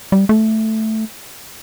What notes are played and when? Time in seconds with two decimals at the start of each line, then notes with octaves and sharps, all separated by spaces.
0.12 G3
0.29 A3